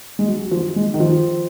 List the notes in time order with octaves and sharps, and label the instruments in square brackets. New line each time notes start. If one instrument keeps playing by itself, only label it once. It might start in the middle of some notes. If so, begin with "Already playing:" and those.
[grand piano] G#3
F#3
F#3
F3
G#3
D#3
F3